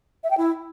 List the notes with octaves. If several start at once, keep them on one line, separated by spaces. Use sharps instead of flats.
E5
G5
E4